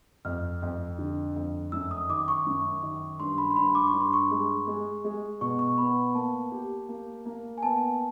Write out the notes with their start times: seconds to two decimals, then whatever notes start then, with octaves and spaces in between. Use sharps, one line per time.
0.25 F2 F6
0.62 F2
0.99 D3
1.36 F2
1.72 F#2 E6
1.91 D#6
2.09 D#3 D6
2.28 C#6
2.46 F#2
2.83 D#3
3.20 G2 C6
3.38 B5
3.51 C6
3.56 G2 B5
3.75 D6
3.87 C#6
3.94 G2
4.00 C6
4.13 C#6
4.31 G#3
4.67 G#3
5.04 G#3
5.41 B2 C#6
5.59 C#6
5.78 B3 B5
6.15 A#3 A5
6.52 G4
6.89 A#3
7.26 A#3
7.58 G#5
7.63 B3 A5